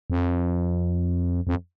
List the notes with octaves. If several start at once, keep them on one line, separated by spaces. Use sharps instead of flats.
F2
F2